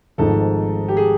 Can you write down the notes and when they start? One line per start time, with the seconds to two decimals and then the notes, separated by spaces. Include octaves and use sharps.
0.18 G#1 G#2 F3 A3 A4
0.88 G4
0.97 G#4